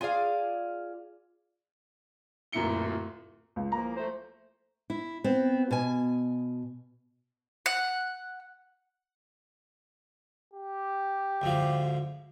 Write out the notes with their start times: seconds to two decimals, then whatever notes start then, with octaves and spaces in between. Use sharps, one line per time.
0.01 F4 G#4 D5 F5
2.52 D1 F#2 A#2 E4 C#7 G7
3.56 C#2
3.72 E3 F3 A#3 A#5
3.96 A3 C5
4.90 E4
5.24 B3 C4
5.71 B2 G#5
7.66 F#5
10.53 G4
11.42 D2 G#2 F3